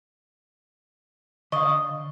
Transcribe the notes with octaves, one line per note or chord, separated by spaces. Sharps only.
D3 D#5 F5 C#6 D#6